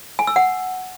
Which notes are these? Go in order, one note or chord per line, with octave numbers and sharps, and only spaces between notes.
G#5
E6
F#5